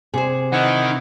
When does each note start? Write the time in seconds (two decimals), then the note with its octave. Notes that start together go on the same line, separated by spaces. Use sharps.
0.14 C3 G#4 C5
0.52 D#3 D#4 E4 B4 F#5